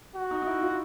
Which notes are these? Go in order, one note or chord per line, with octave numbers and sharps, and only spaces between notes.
F#4
D#4
D#4
E4
F4